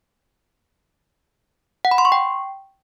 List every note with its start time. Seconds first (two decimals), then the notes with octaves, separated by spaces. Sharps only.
1.85 F#5
1.91 B5
1.98 C6
2.05 C#6
2.12 G5